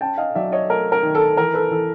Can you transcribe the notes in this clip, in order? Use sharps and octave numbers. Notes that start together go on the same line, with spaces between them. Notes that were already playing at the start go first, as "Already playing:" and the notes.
C#4 G5 A5
D#5 F5
F#3 D5 E5
C#5 D#5
A3 A#4
A#4
D#3
A4
E3 A#4
A4 B4
E3 A4